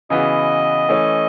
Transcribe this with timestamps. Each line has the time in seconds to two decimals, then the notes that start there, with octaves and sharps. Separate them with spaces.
0.10 C#3 E3 B3 F#4 D#5
0.89 E3 A3 C#4